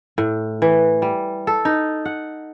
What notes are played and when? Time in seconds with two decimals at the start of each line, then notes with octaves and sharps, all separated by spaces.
0.18 A2
0.62 E3
1.02 G3
1.47 A4
1.65 D#4
2.05 F#5